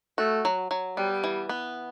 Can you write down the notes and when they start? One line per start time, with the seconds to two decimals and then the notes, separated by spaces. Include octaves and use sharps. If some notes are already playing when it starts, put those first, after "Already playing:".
0.18 A3 F#4
0.45 F#3
0.71 F#3
0.97 G3 B3
1.24 E3
1.49 B3